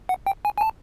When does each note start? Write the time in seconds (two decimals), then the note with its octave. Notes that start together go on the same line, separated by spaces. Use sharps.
0.09 F#5
0.27 G5
0.45 G#5
0.58 G#5
0.61 A5